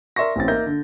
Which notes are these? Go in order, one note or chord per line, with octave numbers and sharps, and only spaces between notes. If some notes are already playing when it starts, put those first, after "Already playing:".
A#4 D5 E5 C6 C#6 A#6
A1 E3 C4 C#4 A6
A#3 D#4 E5 G6 A#6
D3